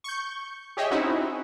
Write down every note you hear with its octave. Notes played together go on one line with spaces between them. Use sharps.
C#6 G6
G4 G#4 C#5 D#5 E5
C4 C#4 D#4 E4 F#4